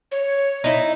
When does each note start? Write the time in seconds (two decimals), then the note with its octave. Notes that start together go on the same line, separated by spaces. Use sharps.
0.12 C#5
0.64 D#4 E4